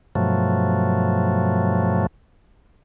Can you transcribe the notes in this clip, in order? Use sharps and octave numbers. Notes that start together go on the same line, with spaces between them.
G2 B2 F3 F#3 A3